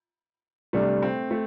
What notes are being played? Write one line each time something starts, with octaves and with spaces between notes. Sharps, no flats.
C3 G3 A3 D4
C4
A3